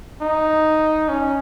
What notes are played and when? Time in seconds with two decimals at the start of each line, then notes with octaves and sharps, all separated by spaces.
0.21 D#4
1.09 C#4